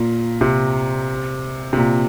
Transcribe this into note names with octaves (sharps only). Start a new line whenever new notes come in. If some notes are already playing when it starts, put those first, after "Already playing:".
Already playing: A#2
C3
C3
A#2